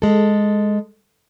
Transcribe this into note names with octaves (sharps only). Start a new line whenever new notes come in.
G#3 A4